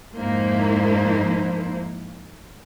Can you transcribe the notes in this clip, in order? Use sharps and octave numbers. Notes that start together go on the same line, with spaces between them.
F2 G#2 A#3 D#4 E4 C5